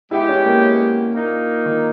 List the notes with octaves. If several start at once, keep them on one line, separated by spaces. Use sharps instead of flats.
G#3 B3 E4 G4
C#4
A#3
C#4
A#2 A#3 D#4 A#4
D#3